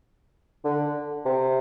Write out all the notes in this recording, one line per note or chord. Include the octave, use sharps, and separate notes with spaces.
D3
C3